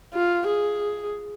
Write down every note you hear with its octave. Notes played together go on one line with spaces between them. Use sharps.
F4
G#4